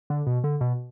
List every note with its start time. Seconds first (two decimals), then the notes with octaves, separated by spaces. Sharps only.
0.10 D3
0.27 B2
0.44 D3
0.61 B2